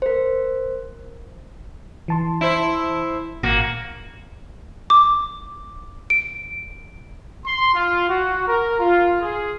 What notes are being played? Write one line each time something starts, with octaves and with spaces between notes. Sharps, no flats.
A#4 C5
E3 A5 C6
E4 C5
G#1 A#2 A#3 F#4
D6
D7
C6
F4
F#4
A#4
F4
G#4